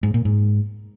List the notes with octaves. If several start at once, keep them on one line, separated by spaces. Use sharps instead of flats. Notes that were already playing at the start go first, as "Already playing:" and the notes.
G#2
A#2
G#2